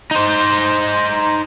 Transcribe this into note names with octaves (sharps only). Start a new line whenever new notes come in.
D#4 C5